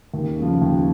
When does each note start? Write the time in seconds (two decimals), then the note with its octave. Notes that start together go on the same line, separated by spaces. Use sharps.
0.14 D#2
0.38 C#3 F3
0.62 D#2